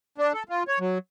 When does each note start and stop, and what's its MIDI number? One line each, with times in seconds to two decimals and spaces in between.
0.18 0.33 62
0.33 0.43 69
0.49 0.63 65
0.68 0.79 73
0.80 0.98 54